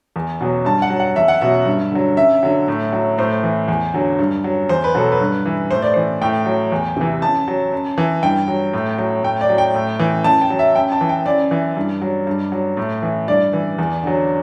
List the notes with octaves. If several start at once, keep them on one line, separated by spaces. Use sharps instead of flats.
E2
B2 F#3
G2 A5
F#5
F#3
F#5
E2 E5
F#5
B2 F#3 E5
G2
D3 F#3
F#2 E5
D3 F#3
A2
F#3
A2 C5
E3
E2
D3 F#3
G2
F#3
E2 C5
B4
B2 F#3 A4
B4
G2
E3
A2 C5
D5
E3 C5
A2 G5
F#3
E2
C3 E3
F#2 A5
F#3
F#2
E3
G2 G5
F#3
A2
F#3
A2 G5
D5
F#3
G5
A2
E3
F#2 A5
G5
F#3
E5
F#2 G5
A5
E3
G5
F#2 D5
E3
G2
F#3
G2
F#3
A2
E3
G2 D5
E3
E2
D3 F#3